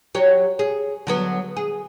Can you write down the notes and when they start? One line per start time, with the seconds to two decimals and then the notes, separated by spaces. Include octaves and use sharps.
0.15 F#3 G4 C#5
0.59 G#4
1.07 D3 F#3 B3
1.56 G#4